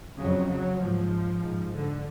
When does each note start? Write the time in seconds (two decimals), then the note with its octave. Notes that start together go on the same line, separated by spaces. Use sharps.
0.18 F2 C#3 F#3
0.49 F#3
0.80 G#2 F3
1.42 G#2
1.73 D3